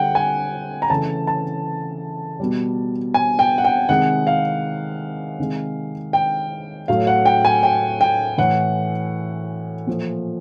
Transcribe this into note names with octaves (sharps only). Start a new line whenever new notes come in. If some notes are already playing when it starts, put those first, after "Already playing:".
Already playing: D3 G3 F#5 G5
G#5
A#5
C#3 E3 A3 A5
A5
B2 G3
G#5
G5
F#5
G5
C3 D#3 G#3 F#5
F5
C3 D#3 G#3
G5
A2 F#3 A3 F5
F#5
G5
G#5
G5
G5
A2 E3 A3 F#5
A#2 F3 A3